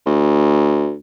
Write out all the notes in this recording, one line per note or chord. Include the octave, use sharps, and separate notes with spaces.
D2